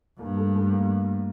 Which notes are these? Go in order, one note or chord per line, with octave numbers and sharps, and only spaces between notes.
G2 A#3
A3
A3
A#3